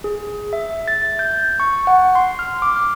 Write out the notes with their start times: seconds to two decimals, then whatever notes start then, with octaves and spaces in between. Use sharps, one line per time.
0.04 G#4
0.53 E5
0.88 A6
1.19 G6
1.60 C#6
1.87 F#5
2.15 C6
2.39 F6
2.62 D6
2.76 F6